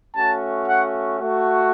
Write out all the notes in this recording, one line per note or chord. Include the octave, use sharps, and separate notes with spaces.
A3 C#4 F#4 A5
F#5
A3 F#4